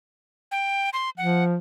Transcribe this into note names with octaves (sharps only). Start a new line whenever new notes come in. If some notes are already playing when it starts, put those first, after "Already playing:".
G5
C6
F3 F#5